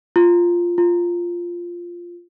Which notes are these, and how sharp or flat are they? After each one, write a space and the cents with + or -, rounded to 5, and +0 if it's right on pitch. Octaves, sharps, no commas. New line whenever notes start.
F4 -5
F4 -5